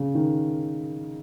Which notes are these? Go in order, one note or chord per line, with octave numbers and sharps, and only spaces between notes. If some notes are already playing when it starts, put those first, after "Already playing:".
Already playing: C#3
D#3